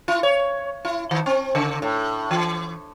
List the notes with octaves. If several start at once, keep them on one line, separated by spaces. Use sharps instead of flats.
E4
C#5
E4
D#3
C4
C#3
A2
E3